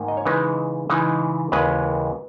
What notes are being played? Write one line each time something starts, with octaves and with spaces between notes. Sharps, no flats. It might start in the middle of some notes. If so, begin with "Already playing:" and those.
Already playing: G#2 D#3 A#3
D#5
C#5
C#3 E3 G#3 D#4 B4
C#3 E3 G#3 D#4
D#2 C#3 E3 G#3 B4